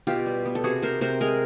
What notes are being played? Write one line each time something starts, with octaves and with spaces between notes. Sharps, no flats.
B2 F4 G4
G3
B3
A4
C3 F#4 G#4
C3 A#4 C5
C3 A#4 C5
G#3 G#4 A#4